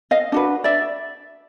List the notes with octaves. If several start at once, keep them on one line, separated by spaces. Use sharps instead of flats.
D#5 F5
D4 F#4 B4
D5 E5